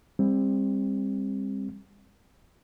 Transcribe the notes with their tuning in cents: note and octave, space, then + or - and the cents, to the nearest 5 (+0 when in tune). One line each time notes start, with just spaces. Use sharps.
G3 +35 C4 +20